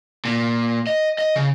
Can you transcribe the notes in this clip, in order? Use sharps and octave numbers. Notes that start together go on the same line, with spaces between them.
A#2
D#5
D#5
C#3